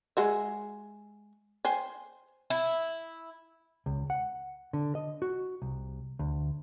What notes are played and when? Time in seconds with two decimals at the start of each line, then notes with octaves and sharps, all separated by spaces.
0.17 G#3 F#4 E5
1.65 C5 G5 G#5
2.50 E4
3.86 C#2
4.10 F#5
4.73 D3
4.95 D#5
5.22 F#4
5.62 C2
6.19 D2